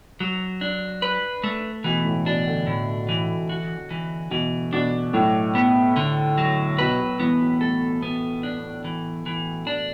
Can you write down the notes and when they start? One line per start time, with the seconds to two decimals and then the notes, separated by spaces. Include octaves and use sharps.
0.20 F#3
0.61 D4
1.02 B4
1.44 A3
1.84 B2 E3
2.05 A2
2.25 B2 D4
2.47 D3
2.67 A2
3.09 E3
3.49 F#4
3.91 E3
4.31 B2 E3
4.73 B2 D4
5.13 A2 F#3
5.55 B3
5.96 D3
6.38 F#3
6.78 B2 B4
7.00 B2
7.20 E3 B3
7.40 F#3
7.61 A3 A4
8.03 B3
8.43 D4
8.85 E3
9.26 E3
9.67 D4